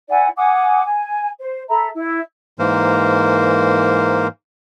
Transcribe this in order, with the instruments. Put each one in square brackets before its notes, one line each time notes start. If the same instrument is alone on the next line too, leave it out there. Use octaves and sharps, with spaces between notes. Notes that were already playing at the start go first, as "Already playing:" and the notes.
[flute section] E4 D5 F#5 G#5
F#5 G#5 D6 D#6
G#5
C5
A4 E5 A#5 B5
E4
[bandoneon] G#2 E3 A#3 A#4 C5